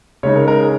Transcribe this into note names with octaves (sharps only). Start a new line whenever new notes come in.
C#3 G#3 D#4 C#5
A#4
A#4
G#4